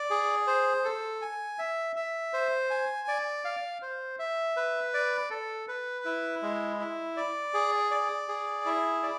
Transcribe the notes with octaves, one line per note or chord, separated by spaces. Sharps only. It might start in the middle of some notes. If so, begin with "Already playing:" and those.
Already playing: D5
G#4
C5
A4
G#5
E5
E5
C5
G#5
D5
F5
C5
E5
B4
D5
A4
B4
E4
G#3
E4
D5
G#4
D5
G#4
E4
D5